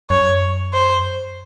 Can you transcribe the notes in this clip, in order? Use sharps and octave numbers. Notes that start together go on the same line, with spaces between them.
F#2 C#5
C5